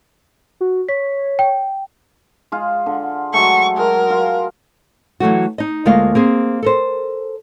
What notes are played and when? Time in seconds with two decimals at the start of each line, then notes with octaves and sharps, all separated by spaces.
0.61 F#4
0.89 C#5 B6
1.39 G5
2.52 G#3 F4 G#4
2.86 D3
3.34 F#3 G#3 A3 C#6
3.77 F#3 G#3 A#4
4.10 F4
5.20 E3 F#3 A3 F#4
5.58 D#4 D#5
5.85 D2 G#3 A#3 F4 D#5 F5
6.15 A#3 C4 G#4
6.63 A4 A#4 C5